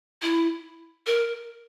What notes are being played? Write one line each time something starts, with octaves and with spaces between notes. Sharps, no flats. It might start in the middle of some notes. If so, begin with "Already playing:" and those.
E4
A#4